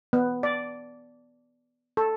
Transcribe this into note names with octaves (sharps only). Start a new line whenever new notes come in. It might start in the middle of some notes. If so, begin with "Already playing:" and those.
B3
D5
A4